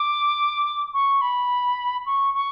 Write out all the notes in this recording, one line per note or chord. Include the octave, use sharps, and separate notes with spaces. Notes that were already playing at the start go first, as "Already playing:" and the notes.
Already playing: D6
C#6
B5
C#6
C#6